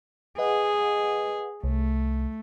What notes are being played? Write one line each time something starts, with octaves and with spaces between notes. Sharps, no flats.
G#4 B4 D#5 F#5
C2 A3